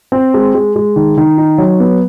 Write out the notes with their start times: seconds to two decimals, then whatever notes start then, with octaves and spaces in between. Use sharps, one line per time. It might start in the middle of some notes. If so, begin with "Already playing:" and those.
0.12 C4
0.34 G#3
0.55 G#3
0.76 G#3
0.96 D#3
1.18 D#3
1.38 D#4
1.58 F#3
1.80 B3